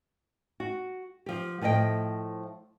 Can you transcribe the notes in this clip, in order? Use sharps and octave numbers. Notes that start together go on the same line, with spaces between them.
F#4
F3 G4
A2 F3 A3 D#5 G5